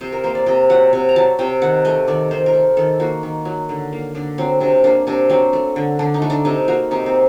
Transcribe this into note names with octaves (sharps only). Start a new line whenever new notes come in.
C3 C5
A#4
A#3 C5
D5
C3 D#5
F#3 F#5
C3
A#5
F#3 A5
C3 G5
D#3 F#5
A3 D#5
D#3 D5
D#3 C5
A#4
A3
D#3 A4
A#3 F#4
D#3
F#3
D3
A#3
D3 D4
F#3 C4
C3 D4
A#3 D4
C3 D4
F#3 C4
A3
D3
D3 D4
D#4
A3
D4
C3 D#4
A#3 F#4
C3 D#4
C4